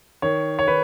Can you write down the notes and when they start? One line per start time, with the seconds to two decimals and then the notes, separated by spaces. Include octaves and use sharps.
0.22 D#3 C#5
0.59 C#5
0.68 D#3 B4